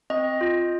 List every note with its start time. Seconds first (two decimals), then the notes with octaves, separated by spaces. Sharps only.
0.10 C4 D#5
0.41 F4